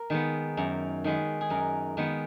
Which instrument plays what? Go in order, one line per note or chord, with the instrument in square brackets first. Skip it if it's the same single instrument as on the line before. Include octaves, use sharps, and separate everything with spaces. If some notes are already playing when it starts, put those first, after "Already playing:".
Already playing: [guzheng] A#4
D#3 G#3 B3
F#2
D#3 G#3 B3
G#4
F#2 A#4
D#3 G#3 B3